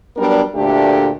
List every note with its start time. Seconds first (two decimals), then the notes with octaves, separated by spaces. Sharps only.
0.17 F#3 G3 B3 D4 A#4
0.54 D2 A#2 A3 D4 G4